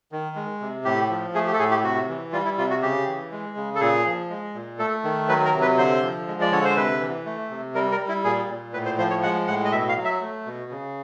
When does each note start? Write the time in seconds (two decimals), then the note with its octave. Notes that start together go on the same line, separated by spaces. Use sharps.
0.12 D#3
0.36 G#3
0.61 C3
0.85 A2 G4
1.10 F3
1.34 A3 G#4
1.47 G4
1.54 A4
1.59 A2 G#4
1.71 G4
1.83 C3 F#4
2.08 E3
2.33 G3 F4
2.45 E4
2.58 C3 F4
2.70 F#4
2.82 C#3 G4
3.07 E3
3.32 G#3
3.57 C#3
3.75 A4
3.81 A#2 G#4
4.06 F3
4.30 G#3
4.55 A#2
4.79 A3 A4
5.04 D#3
5.29 F#3 B4
5.45 A#4
5.54 C3
5.62 B4
5.78 D3 C5
6.03 F3
6.28 G#3
6.41 D5
6.52 D3 C#5
6.65 C5
6.76 C3 B4
7.01 E3
7.26 A3
7.50 C3
7.75 G3 A#4
7.92 A#4
7.99 G3
8.08 E4
8.24 A#2 G#4
8.49 A#2
8.73 A2 B4
8.85 C5
8.98 F3 C5
9.10 C#5
9.23 G#3 F#5
9.47 A2 F#5
9.65 D#5
9.72 B2 E5
9.89 F5
9.97 F#3
10.05 E5
10.21 A3
10.46 B2
10.71 C#3